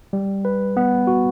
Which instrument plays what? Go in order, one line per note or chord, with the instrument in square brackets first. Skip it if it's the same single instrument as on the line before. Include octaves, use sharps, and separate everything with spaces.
[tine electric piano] G3
B4
B3
F#4